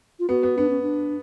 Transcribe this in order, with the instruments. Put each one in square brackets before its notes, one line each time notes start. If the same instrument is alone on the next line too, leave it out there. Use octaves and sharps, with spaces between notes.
[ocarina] F4
[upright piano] B3 [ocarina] F#4
[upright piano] B3
[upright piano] B3 [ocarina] D4
[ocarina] C#4
D4